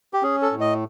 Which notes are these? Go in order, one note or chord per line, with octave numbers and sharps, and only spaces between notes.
G4
C#4 G#4
A4
A2
D#5